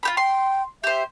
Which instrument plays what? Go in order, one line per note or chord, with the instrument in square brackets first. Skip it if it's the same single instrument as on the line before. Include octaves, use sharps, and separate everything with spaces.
[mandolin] F4 G4 B5
[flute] G5 [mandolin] C6
[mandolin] G4 C5 [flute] E5